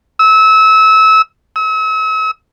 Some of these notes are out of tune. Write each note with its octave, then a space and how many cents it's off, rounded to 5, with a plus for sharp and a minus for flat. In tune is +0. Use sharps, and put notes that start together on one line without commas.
E6 -25
E6 -40